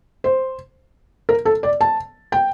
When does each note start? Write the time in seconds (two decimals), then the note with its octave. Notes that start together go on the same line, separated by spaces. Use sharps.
0.24 C5
1.29 A#4
1.45 A4
1.63 D5
1.81 A5
2.32 G5